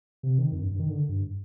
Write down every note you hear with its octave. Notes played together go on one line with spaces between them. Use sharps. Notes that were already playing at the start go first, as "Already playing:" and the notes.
C3
D#3
F2
G2
G2
D#3
D3
G2